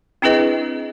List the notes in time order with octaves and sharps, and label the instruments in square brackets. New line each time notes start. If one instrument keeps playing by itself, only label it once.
[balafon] C4 D4 E4 G#4 B4 D#5